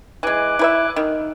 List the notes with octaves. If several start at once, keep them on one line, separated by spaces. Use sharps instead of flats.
E3 G#3 G#5 D6 F#6
E4 B4 E5
D#3